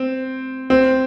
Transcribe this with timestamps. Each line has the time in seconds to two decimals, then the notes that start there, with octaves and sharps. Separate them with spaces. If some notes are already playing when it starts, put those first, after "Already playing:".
Already playing: C4
0.70 C4